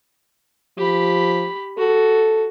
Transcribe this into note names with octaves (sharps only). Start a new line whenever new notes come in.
F3 G4 B5
F#4 A4